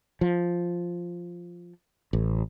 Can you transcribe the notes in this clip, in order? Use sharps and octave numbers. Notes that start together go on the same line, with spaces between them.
F3
A1